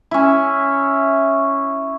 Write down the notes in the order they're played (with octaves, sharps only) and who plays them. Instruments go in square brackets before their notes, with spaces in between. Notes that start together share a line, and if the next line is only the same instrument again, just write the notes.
[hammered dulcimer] C#4 E4